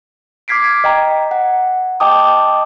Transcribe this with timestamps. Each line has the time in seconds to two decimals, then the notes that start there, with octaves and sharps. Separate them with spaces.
0.48 D6 F6 G#6 B6 C7 D7
0.84 D#5 G5 A#5
1.31 F#5
2.00 D#5 G5 A5 D6 D#6